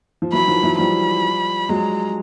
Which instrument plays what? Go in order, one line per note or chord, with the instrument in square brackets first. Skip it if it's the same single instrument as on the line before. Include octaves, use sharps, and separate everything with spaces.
[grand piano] F3
[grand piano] E3 F#3 [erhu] B5
[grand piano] D#3 F3
E3 F#3
[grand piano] F3 G3 [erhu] B5
[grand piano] F#3 G#3 [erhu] A#5